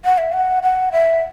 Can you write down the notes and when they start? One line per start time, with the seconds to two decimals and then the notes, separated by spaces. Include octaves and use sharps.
0.05 F#5
0.18 E5
0.32 F#5
0.63 F#5
0.92 E5